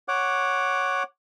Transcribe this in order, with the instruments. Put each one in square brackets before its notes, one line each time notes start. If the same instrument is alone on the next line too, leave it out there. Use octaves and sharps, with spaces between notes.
[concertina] C#5 F#5 D6